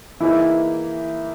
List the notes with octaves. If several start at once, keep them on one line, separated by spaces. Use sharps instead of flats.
E3 A#3 D#4 E4 G#4 B4